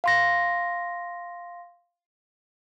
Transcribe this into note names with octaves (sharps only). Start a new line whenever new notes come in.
F5 C6 A#6